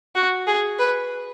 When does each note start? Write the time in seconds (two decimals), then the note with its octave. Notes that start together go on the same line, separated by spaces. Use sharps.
0.15 F#4
0.47 G#4
0.79 B4